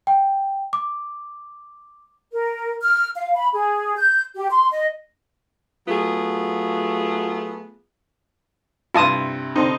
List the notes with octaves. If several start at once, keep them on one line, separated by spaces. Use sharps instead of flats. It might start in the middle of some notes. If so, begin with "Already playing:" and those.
G5
D6
A#4
F6
F5
B5
G#4
G6
G4
C6
D#5
F#3 A3 B3 F4 G#4
G2 C3 E4 F4 B4 A5 D#6
D3 C4 D#4